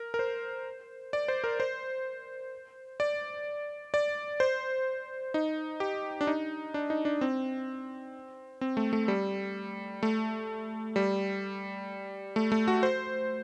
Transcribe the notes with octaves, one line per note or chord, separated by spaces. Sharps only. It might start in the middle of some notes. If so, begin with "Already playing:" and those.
Already playing: A#4
A#4
C5
D5
C5
A#4
C5
D5
D5
C5
D#4
G4
D4
D#4
D4
D#4
D4
C4
C4
A3
A3
G3
A3
G3
A3
A3
F#4
C5